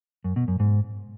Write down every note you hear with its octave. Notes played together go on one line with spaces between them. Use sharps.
F#2
B2
F#2
G#2